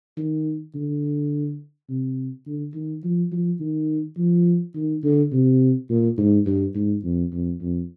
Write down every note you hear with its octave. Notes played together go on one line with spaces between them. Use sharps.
D#3
D3
C3
D3
D#3
F3
F3
D#3
F3
D#3
D3
C3
A#2
G#2
G2
G#2
F2
F2
F2